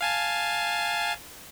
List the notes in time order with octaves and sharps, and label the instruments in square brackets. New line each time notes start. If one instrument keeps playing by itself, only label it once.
[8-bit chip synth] F5 G#5 A5